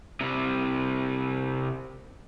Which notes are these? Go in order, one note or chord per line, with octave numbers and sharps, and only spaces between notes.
C3 G3